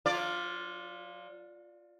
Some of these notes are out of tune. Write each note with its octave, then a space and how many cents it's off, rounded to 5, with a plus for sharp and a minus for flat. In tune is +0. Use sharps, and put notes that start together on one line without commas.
F#3 -40 F4 +0 D5 +0